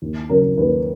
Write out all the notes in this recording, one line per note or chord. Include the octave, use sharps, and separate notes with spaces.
D#2
C#3 F#3 A#4
D#2 B4